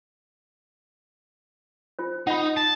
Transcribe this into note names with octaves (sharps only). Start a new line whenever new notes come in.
F4 C5
D#4 F4 F#5
A5